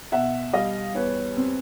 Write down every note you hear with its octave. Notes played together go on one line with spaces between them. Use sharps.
B2 E5 F#5
G3 D#5 F5
E2 B4 C#5
C4